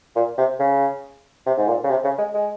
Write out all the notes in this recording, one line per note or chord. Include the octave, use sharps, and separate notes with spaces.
A#2
C3
C#3
C3
G#2
A#2
C#3
C3
C#3
G#3
G#3